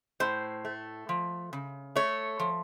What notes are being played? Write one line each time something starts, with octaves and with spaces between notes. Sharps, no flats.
A2 C5
A3
F3
C#3
A3 C#5
F3